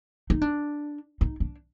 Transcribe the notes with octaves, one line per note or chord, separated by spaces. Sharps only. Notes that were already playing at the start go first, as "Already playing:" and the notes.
D#4
D4
D#4
D4